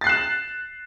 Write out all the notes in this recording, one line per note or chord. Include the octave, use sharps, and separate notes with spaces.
F#6 A6 C7 E7